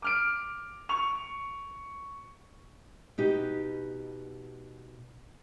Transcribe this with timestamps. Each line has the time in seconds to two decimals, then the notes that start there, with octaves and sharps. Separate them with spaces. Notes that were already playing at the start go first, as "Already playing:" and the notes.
0.02 D6 F6 D7
0.89 C#6 F7
3.18 B2 D#4 G4